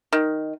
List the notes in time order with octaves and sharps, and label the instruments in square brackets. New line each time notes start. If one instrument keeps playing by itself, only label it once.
[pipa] D#3